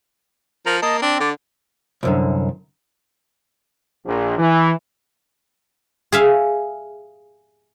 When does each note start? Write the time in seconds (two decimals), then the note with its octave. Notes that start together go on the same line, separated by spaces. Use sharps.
0.66 F3 A#4 A#5
0.82 A#3 D#5 A5
1.02 C4 D4
1.20 D3 D5
2.03 C2 F#2 D3
4.06 A#1
4.38 E3
6.12 G#4 E5 F5